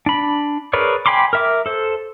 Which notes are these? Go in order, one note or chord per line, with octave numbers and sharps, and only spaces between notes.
D4 B5
G#4 A#4 B4 C#5 D5
G5 G#5 B5 C6 D6
A#4 E5 D6
A4 C5